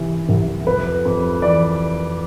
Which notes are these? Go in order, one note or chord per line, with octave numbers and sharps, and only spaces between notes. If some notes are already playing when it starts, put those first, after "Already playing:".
Already playing: C3 E3
C2
F2 B4
F2
E3 D5